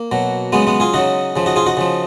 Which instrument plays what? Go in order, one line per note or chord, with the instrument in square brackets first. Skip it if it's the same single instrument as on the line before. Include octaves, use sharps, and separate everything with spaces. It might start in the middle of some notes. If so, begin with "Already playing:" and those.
Already playing: [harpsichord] A#3
B2 F#3
C#3 F#3 G#3 B3
G#3 B3
F4 G#4
C#3 F#3 D#4 F#4
C#3 F3
D#4 F#4
F4 G#4
D#4 F#4
C#3 F3